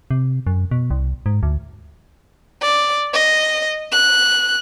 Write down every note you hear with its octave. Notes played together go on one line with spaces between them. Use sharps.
C3
F#2
B2
C2
G#2
D2
D5
D#5
F#6